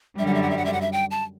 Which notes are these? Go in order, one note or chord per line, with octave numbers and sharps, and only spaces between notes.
F#2 D3 G3 E5
F#5
E5
F#5
E5
F#5
E5
F#5
E5
G5
A5